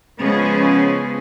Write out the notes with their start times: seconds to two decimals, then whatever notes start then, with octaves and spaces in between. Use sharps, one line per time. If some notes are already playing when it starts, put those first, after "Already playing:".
0.19 C#3 F3 G#3 B3 C#4 G#4